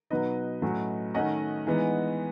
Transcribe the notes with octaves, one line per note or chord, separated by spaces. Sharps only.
B2 F#3 B3 D#4 B4 D#5
A2 F#3 C#4
D#3 A3 C#4 D#5 F#5
E3 G#3 B3 D#4